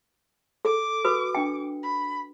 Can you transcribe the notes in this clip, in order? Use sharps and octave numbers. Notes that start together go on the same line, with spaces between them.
A4 D6
F#4 B4 D#6
D4 G5
B5